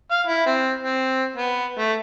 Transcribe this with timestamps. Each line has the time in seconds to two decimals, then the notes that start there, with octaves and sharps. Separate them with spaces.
0.11 F5
0.27 E4
0.46 C4
0.80 C4
1.36 B3
1.79 A3